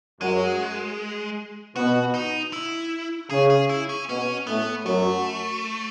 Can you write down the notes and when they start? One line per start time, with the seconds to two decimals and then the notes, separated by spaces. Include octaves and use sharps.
0.20 F#2 F#3 G#3
1.76 B2 B3 F#4
2.14 D#4
2.53 E4
3.30 C#3 C#4 G#4
3.50 G#4
3.69 E4
3.89 C#4
4.08 B2 B3 C#4
4.47 A2 A3 B3
4.85 F#2 F#3 A3